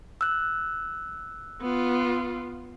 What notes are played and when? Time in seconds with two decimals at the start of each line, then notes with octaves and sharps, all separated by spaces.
0.21 E6 F#6
1.61 B3 F4